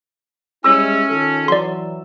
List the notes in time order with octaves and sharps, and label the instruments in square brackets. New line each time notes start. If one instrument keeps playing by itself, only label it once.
[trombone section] G3 G#3 E4 [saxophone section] C#4 [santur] E6
[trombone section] D#3 F4 A4
[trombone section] E3 F#3 [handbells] D5 C6